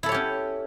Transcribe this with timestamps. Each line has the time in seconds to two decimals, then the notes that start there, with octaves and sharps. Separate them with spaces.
0.03 E4
0.06 A4
0.09 C#5
0.12 G4
0.14 C#4